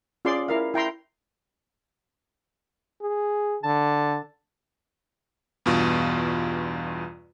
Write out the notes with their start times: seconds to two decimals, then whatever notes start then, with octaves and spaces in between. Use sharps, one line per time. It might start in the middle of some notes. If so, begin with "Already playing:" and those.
0.25 C#4 F4 G#4 D5 C6 D6
0.48 E4 A#4 F5
0.74 E4 G5 A#5 C6
3.02 G#4
3.63 D3 A5
5.66 E2 G2 B2 F4